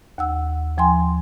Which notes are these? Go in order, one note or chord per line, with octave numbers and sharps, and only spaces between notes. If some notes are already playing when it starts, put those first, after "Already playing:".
D#2 F#5 E6
D#2 F3 G5 G#5 C6